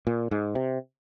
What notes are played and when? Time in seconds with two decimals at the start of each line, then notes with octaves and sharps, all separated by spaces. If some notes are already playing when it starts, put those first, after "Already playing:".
0.07 A#2
0.31 G#2
0.55 C3